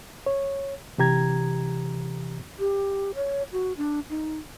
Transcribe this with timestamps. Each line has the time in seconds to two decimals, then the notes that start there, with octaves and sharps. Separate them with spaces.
0.26 C#5
0.98 C3 E3 G4 A#5 G#6
2.59 G4
3.15 C#5
3.52 F#4
3.77 D4
4.10 D#4